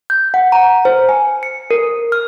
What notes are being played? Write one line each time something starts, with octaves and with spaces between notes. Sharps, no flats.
G6
F#5
A#5
C5
G#5
C#7
A#4
F6